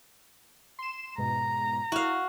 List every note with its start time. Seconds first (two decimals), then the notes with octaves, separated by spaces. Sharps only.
0.79 C6 E7
1.18 G#2 B2 A#5
1.92 E4 F#4 F5